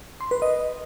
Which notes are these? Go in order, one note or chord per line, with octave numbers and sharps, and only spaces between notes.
C6
B4
D#5